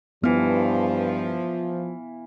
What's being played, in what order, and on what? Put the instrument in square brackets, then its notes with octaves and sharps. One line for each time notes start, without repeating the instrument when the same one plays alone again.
[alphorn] G2 [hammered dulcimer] E3 F5 [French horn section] F3 [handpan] B3